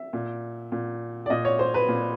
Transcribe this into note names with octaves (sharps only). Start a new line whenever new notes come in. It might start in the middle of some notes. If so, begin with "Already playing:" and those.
Already playing: E5
A#2
A#2
D5
A#2 D#5
C#5
C5
B4
A#2